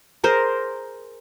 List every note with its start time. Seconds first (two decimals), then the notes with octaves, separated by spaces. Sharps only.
0.24 G#4 A#4 C5